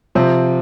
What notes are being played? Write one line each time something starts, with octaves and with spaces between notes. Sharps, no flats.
C3 F3 C4